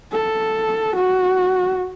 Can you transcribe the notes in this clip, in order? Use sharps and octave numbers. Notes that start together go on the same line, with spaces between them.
A4
F#4